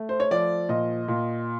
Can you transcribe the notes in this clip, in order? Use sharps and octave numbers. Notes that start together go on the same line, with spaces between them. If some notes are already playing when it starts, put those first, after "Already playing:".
Already playing: A3
C5
C#5
F3 D5
A#2 D#5
A#2